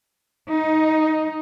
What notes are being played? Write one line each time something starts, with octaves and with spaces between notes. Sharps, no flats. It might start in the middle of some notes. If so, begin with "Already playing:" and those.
D#4